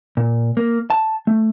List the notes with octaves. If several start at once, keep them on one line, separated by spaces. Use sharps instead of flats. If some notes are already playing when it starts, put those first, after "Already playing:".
A#2
A#3
A5
A3